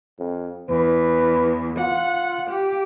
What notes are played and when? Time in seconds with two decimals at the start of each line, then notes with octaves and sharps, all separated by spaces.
0.19 F2
0.70 E2 B4
1.79 F4 F#5
2.50 G4